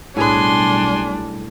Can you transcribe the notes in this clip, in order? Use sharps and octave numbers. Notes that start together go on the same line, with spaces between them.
B1 A2 G3 D4 G#4 B4 G#5 C6